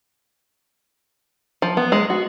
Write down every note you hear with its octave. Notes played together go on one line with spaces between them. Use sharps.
F3
B3
G#3
F#4